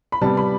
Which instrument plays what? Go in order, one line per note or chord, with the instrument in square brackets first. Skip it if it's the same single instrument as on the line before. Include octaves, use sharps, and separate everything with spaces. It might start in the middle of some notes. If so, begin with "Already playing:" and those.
[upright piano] B5
C3 G3 B3 A5
B5